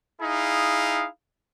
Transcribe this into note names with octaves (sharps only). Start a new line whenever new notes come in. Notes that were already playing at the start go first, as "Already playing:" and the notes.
D#4 E4 G#4 F5